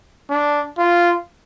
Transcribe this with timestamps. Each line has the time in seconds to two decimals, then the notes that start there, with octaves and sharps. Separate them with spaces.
0.30 D4
0.78 F4